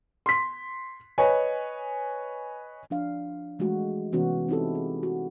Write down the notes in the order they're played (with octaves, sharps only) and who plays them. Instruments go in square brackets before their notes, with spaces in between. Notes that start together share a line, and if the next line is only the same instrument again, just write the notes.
[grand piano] C6 B6
B4 C#5 D#5 G#5
[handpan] F3 D4 F5
E3 G#3 A3 F#4
C3 E3 B3 C#4 F#4
C4 D#4 E4 G4 A4
G#4
F#4